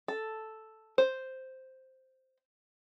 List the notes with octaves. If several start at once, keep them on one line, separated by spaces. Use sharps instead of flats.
A4
C5